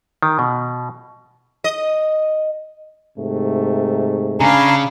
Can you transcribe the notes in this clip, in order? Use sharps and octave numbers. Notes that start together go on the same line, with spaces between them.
D#3
B2
D#5
G#2 C3 A3
C#3 D4 F5 G#5 A#5 B5